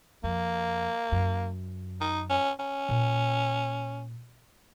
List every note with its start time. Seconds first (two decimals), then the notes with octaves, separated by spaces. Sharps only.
0.24 F2 A#3
1.12 F#2
2.01 D#4
2.30 C#4
2.59 C#4
2.89 A#2